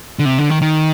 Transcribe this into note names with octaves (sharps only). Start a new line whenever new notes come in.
D3
C3
D3
D#3
D#3